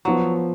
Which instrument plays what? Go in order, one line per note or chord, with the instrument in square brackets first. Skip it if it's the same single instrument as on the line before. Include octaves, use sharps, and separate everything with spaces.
[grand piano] F3 B3 [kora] F#3